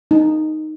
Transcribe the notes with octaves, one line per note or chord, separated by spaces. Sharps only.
D#4